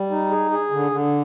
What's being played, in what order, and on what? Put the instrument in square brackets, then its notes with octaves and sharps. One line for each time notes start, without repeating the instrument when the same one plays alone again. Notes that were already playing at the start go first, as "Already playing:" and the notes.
Already playing: [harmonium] G3
D#4
G#4
G#4
D3
D3